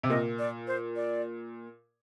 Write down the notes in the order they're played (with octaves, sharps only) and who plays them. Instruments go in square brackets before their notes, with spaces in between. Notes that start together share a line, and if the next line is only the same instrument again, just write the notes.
[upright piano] C3
[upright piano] A#2 [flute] D#5
[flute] D5
C5
D5